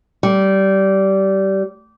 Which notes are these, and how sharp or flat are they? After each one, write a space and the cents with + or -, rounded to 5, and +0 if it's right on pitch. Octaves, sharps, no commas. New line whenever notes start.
G3 -20